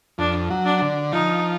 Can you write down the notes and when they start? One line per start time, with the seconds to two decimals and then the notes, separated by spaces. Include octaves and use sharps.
0.18 F2 D4
0.50 F#3
0.65 D4
0.82 D3
1.12 F3 D#4